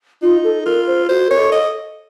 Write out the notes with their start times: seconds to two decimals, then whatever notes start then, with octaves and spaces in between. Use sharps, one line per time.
0.22 D#4 F4
0.44 A4
0.66 F4 A#4
0.87 C5
1.09 F#4 C5
1.28 A#4 C#5
1.37 A4
1.52 D#5